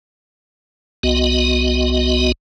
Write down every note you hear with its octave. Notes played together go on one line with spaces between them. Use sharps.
C2 B3 F#4 D#5